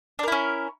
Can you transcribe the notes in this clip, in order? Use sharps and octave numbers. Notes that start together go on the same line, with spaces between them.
C#4 D4 E4 A#4